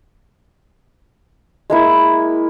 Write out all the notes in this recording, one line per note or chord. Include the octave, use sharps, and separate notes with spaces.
G#3 A#3 E4